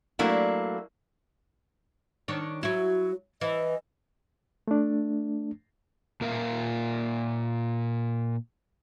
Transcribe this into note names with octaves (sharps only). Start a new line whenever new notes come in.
F#3 A3 A#3 D4 E4
D#3 D4 C#5
F#3 E4 F#4
E3 D#5
A3 D4
A#2 A#4 E5 F5